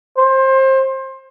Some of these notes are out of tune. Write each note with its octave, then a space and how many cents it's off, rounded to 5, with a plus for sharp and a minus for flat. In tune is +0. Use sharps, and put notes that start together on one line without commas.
C5 +25